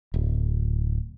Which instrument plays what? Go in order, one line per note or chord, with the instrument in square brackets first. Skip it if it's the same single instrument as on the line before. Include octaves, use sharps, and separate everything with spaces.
[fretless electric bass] D1